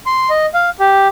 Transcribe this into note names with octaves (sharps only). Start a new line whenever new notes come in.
C6
D#5
F5
G4